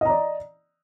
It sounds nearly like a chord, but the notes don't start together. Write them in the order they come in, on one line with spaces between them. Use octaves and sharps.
D#5 A#5 D5